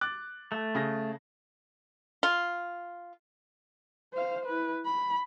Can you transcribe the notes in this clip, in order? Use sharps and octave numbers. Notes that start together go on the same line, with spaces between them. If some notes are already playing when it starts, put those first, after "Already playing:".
D6 F#6 A6
A3
C#3 G#4 A#6
F4
C5 F5
E4 B4
B5